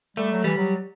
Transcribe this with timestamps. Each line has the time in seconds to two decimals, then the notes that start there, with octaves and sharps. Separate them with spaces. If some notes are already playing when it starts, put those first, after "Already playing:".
0.17 G3 A3
0.31 F#3
0.44 E3 G3
0.57 F#3